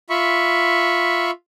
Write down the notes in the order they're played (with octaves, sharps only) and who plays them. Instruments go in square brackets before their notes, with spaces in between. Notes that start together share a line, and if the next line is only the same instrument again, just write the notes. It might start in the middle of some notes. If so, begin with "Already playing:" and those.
[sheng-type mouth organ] F4 E5 B5 C#6